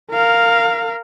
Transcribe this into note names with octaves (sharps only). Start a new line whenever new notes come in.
A#4 F5